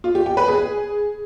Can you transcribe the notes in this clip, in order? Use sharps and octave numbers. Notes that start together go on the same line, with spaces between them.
F4
G4
G5
B4
G#4